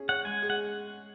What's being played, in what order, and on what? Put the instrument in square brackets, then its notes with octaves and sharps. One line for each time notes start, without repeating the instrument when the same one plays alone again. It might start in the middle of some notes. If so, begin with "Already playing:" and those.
Already playing: [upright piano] C#4 G#4
[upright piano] C#5 [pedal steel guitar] F#5
[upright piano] G#3 [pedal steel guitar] G#5
[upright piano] G#4
[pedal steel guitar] F#5